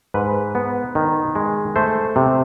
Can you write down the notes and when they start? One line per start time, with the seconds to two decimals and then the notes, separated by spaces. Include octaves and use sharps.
0.14 G#2 B4
0.55 B3
0.95 D#3
1.35 G#3
1.76 A3 C5
2.16 C3